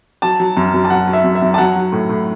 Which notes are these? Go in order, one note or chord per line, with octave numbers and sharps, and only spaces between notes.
F#3 A5
F#3
F#2
F#2
A5
F#3 F#5
F#3
E5
F#2
E5
F#2
A5
F#3 F#5
F#3
A2
A2